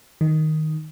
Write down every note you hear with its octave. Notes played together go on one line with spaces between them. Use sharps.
D#3